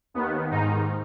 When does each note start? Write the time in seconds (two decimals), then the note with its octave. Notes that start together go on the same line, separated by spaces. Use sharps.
0.14 D#2 D#3 B3
0.51 G#2 D#3 D#4